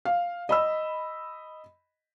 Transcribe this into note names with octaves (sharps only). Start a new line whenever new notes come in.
F5
D#5 B5 E6